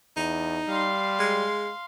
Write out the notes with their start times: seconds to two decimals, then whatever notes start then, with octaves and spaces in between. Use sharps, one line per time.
0.16 E2 D#4
0.68 G3 F5 C6
1.20 G#3